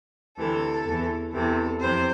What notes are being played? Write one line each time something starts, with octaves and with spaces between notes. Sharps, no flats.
D2 C3 E3 A4
E2 E3
E2 C3 E3 A4
F2 C3 E3 C5